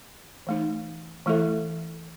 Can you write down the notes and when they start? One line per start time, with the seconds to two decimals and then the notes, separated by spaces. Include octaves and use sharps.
0.47 E3 A3 D#4
1.26 E3 A3 E4 A4 E5